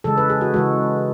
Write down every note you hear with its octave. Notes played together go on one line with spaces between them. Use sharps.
C#3 E3 G#3 A4
B4
G#4
F#4
C#3 E3 G#3 F#4